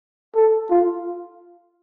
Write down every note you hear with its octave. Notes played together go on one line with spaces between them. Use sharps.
A4
F4